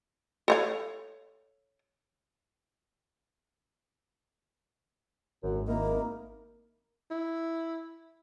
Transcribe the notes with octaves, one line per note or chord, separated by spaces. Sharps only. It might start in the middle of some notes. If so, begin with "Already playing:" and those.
A4 C#5 F5
G#1 F#2
A#3 D#4 E4 A#4
E4